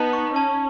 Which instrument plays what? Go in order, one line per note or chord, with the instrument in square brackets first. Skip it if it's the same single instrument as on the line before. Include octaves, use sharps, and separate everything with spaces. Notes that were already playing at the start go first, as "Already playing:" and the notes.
Already playing: [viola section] B3 D#4 [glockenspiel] A5
[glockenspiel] C#6
[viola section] C#4 [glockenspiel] A5